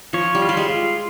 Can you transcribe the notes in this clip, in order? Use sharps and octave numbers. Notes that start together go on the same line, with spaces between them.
F3 C#5
G3
F4
G3
G#3
F4